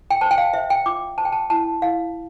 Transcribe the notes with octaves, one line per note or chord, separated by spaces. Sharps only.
G5
C5 A5
G5
F5
C5 E5
G5
F4 D6
C5 A5
G5
A5
E4 A5
E4 F5